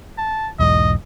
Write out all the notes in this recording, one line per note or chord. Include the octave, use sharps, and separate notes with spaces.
A5
B1 E2 G#2 D#5